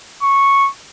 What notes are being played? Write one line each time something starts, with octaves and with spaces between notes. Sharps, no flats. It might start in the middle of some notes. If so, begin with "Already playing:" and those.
C#6